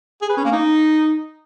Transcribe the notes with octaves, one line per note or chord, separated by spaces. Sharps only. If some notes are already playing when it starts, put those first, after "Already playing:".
G#4
B4
C#4
A#3
D#4